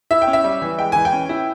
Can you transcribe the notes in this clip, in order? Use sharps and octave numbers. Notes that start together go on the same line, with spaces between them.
E4 E5
G5
C#4
E5
G3
E3
G#3 G5
E3 G#5
G5
C#4
E4